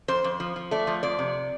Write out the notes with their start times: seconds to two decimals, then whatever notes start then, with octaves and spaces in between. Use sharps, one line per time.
0.08 F2 C5
0.24 F2
0.40 F3
0.56 F3
0.71 A3 D5
0.87 F3
1.03 F2 D5
1.19 C3